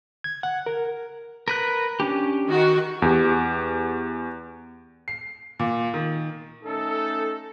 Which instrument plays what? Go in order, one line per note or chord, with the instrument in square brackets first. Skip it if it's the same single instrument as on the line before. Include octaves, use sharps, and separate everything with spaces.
[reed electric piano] G#6
F#5
A#4
[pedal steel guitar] A#4 B4 F#6
C#4 D4 G4
[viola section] D#3 F#4
[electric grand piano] E2 G4
[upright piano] C7
A#2
D#3
[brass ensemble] A3 C#4 D#4 A4